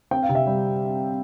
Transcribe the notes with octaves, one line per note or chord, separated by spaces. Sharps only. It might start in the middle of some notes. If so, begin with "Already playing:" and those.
C4 G5
F5
C3
E5
G3